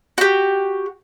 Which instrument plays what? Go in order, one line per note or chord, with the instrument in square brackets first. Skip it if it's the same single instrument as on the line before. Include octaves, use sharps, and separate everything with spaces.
[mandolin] F#4 G4